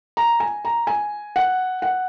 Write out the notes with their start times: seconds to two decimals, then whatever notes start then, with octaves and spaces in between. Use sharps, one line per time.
0.17 A#5
0.40 G#5
0.65 A#5
0.87 G#5
1.36 F#5
1.82 F#5